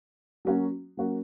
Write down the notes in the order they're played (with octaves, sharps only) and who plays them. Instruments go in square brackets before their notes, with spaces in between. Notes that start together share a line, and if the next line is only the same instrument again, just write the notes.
[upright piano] F#3 A#3 C#4 F#4
F#3 A#3 C#4 F#4